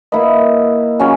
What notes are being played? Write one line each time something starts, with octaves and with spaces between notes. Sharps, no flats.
A#3 E4 B4 D#5
C#3 F#3 C#4